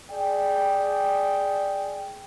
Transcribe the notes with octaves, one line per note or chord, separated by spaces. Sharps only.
G#4 D5 G5